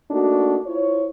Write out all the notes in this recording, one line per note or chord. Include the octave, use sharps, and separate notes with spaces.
A3 A#3 D4 D#4 F#4
E4 F4 C5 C#5